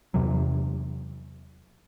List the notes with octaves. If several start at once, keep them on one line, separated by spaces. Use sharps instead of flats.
E2 C3 F#3